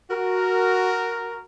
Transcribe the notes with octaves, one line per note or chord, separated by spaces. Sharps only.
F#4 A#4